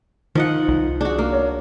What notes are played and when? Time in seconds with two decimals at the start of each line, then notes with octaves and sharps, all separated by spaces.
0.35 D#3 F3 D#4 D#5 F#5
0.68 C2
1.01 D4 F#4 G#4
1.19 A#3
1.32 C#5